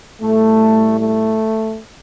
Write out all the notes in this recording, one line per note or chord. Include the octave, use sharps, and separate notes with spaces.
A2 G3 A3
A3